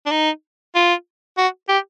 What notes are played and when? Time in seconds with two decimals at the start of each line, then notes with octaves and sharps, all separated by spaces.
0.06 D4
0.11 D#4
0.75 F4
1.37 F#4
1.68 G4